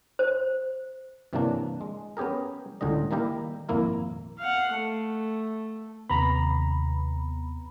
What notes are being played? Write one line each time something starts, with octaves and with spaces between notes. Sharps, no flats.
C5
G2 C3 E3 F#3 A#3 D4
G#3
B3 C#4 G4 G#4 A#4
C#2 A2 D3 G3 D#5
D#3 G3 A#3 E4 G4 A#4
G#1 F2 A#2 A#3 E4 A#4
F5 F#5
A3
D#2 C3 B3 A#5 B5